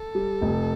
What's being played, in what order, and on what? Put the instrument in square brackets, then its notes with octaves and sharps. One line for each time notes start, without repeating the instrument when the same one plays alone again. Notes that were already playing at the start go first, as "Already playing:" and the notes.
Already playing: [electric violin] A4
[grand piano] G3
F1